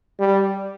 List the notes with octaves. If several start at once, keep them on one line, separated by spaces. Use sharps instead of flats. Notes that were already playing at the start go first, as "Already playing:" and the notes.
G3